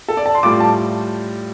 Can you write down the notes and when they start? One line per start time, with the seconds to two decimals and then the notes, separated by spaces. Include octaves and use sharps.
0.08 A4
0.17 D5
0.26 A5
0.35 C6
0.43 A2 G3 F4 D6
0.60 A5